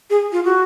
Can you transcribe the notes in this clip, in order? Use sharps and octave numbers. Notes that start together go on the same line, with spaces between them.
G#4
F4
F#4